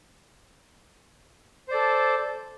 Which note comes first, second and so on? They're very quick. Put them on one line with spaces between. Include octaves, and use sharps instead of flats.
C5 D5 A4